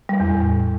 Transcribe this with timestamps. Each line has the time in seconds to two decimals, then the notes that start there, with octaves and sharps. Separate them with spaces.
0.09 G3
0.20 E2
0.30 A2